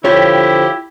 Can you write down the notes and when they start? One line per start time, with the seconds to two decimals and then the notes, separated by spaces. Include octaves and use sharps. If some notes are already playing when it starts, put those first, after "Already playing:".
0.05 D3 F3 E4 F4 G4 C#5